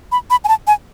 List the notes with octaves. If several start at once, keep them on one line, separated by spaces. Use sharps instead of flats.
B5
B5
G#5
A5
G#5